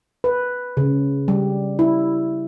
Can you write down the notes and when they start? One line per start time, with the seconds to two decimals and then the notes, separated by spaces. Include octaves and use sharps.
0.24 B4
0.77 C#3
1.28 G3
1.79 E4